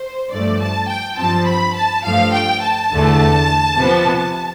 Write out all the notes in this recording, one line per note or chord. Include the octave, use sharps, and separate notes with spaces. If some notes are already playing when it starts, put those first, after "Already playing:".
Already playing: C5
G2 F3 A3 D5
A5
G5
G2 F3 C4 A5
B5
A5
G2 F3 A3 F5
G5
A5
E2 D3 A3
C3 F3 B3